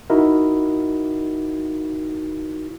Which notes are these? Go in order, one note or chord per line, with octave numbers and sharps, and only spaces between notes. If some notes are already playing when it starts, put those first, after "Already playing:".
D#4 E4 F#4 A#4